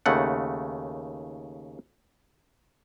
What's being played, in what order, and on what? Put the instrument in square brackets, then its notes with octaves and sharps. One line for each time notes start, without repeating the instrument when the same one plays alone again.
[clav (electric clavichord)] D#2 C#3 A3 F#5